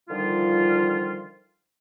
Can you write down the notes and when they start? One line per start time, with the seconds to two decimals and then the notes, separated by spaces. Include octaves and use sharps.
0.09 D3 D#3 F3 G3 F4